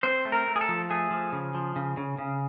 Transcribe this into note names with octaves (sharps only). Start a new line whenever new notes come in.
C4 C5
A3
A#4
A3
G#4
A4
F3
A3 G#4
F3
C#3
F3
C#3
C#3
C#3